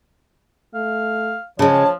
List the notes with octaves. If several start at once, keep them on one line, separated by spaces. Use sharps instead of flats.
A3 F5
C#3 F3 G#3 C#5 A5